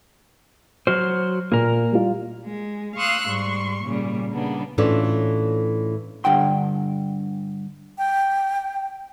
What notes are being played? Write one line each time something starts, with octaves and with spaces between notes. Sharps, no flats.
F#3 F#4 C5 F6
A#2 A#3 A#4
G3 F4
G#3
F5 C6 C#6 D#6 E6 F#6
G#2 G3 C6 C#6
A#2 C#3 G3
C#3 G3 A#3 B3 D4
A2 E3 C#4 D4 F4 A4
G2 D3 F#5 G5 C6
G5